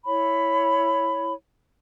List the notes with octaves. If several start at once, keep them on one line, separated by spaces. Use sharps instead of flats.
E4 C#5 B5